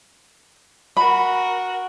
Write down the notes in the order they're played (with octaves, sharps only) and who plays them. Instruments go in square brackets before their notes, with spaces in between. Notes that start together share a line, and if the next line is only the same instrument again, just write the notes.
[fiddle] F#4 A#4 [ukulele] B5